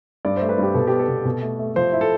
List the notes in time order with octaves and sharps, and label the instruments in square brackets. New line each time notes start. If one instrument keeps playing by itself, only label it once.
[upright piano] G2 [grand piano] D5
[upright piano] A3 [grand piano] C5
[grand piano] B4
[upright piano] G2 [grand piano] G4
[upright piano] B2 [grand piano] A4
[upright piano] B3 [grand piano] G4
[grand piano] A4
[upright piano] B2
B2
A3
A3
[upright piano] F3 [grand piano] C5
[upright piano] E4
[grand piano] A4